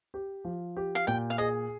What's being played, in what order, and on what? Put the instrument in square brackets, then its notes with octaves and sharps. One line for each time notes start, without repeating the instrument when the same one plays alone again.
[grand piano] G4
F3
G4
[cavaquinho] F5
[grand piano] A#2 [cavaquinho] G5
[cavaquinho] F5
[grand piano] G#4 [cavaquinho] D#5